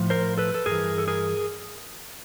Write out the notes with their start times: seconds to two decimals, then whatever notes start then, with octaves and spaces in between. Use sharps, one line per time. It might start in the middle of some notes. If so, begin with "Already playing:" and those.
Already playing: A2 F3
0.10 A#4 C5
0.38 A4 B4
0.54 A4
0.66 G2 E3 G#4 A#4
0.98 A4
1.08 G#4 A#4